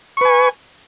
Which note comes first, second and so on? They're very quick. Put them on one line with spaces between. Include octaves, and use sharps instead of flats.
C#6 B4 G#5